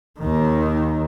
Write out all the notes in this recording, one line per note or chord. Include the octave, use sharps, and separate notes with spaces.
D#2 D#3